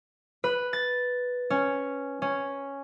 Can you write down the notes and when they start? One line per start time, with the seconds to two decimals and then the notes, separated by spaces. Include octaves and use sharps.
0.44 B4
0.73 A6
1.50 C#4
2.22 C#4